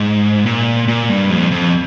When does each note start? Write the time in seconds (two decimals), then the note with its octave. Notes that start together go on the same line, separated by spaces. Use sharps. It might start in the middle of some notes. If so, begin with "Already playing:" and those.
Already playing: G#2
0.46 A#2
0.88 A#2
1.09 G2
1.30 F2
1.51 F2